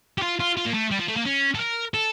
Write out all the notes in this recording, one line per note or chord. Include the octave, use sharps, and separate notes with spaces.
G4
F4
F4
F4
A#3
A3
G3
F3
A3
A#3
C#4
A4
A#4
A4